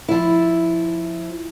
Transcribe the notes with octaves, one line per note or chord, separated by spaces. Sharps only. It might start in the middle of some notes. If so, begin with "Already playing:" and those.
F3 E4